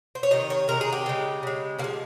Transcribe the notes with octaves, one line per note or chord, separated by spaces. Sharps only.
C5
C#5
C3 D#3 D#5
C#5
C3 D#3 G#3 A#4
G#4
G4
C#3 G#3
C#3 G#3
C3 A#3
F3 G#3